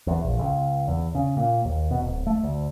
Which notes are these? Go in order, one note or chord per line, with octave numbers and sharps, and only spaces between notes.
E2
A#1
C#2
E2
C#3
A#2
D#2
B2
D1
A3
D2